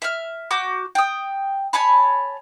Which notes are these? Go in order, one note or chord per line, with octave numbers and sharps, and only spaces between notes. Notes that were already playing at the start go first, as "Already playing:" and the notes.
E5 F6
F#4 D6 G6
G5 D#6
C#5 G#5 A5 B5